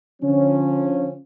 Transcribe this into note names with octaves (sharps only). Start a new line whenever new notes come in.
D3 F3 C#4